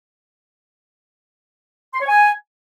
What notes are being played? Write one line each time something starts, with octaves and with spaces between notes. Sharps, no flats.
C6
C#5
G#5